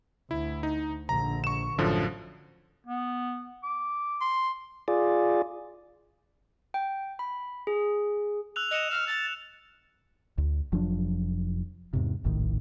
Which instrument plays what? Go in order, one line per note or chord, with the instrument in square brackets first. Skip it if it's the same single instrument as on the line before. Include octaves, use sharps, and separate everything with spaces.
[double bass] D2 [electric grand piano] E4
[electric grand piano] D#4
[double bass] A#1 D3 [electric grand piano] A#5
[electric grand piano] C#6 E7
[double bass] A1 [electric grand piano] F#2 D3 F3
[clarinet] B3
D6
[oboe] C6
[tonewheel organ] F4 G#4 D5
[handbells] G5
B5
G#4
[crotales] E6 F#6 F7
[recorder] D#5 [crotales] F#6 C#7 E7
[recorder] F6 [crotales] E7
[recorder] A6
[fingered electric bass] D2
F1 F3 F#3 D4
E2 G#2 C3
F1 A#1 A2 D#3